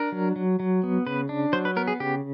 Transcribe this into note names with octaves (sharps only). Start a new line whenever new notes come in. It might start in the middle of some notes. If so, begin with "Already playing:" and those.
Already playing: D4 A#4
F#3
F#3
F#3
B3
C#3 B4
D4
F#3 C5
B4
B3 A#4
G#4
C#3 G4